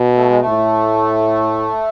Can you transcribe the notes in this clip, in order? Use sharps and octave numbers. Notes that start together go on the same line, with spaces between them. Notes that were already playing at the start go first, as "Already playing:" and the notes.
Already playing: B2
A3
G#3
A3
A2